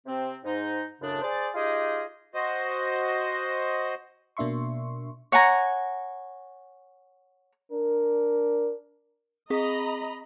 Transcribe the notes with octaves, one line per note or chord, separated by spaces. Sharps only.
C3 C4
G#2 D#4
F#2 A2 C#3 D4
G#4 C5 D5
D#4 F4 G4 G#4 D#5
F#4 C5 D#5
B2 A#3 D4 E5 C6 C#6
C#5 F#5 G#5 A#5
D4 A#4
C4 G#4 D#5 A#5 B5